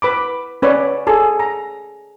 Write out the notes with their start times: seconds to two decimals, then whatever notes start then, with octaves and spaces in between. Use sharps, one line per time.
0.02 B4 B5 D6
0.62 C#4 B4 C#5 D5
1.07 G#4 A4
1.40 A#5